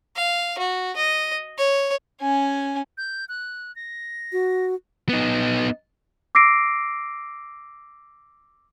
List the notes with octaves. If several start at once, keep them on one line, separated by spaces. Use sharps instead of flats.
F5
F#4
D#5
C#5
C#4 G#5
G6
F#6
A#6
F#4
B3 D#4
D6 E6 A#6 C7 D7